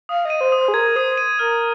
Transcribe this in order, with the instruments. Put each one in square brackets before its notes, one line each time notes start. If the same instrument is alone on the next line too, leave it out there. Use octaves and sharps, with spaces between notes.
[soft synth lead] F5 [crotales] D#6
[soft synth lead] D#5 [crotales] D#7
[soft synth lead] C5
[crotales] D#6
[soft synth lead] C5
G#4
[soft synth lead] A#4 [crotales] G#6
[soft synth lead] C5 [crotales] D#6
[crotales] D#7
[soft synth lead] A#4 [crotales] F6